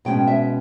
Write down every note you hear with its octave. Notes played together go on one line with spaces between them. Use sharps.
B2 G#3 C#4 G5
E5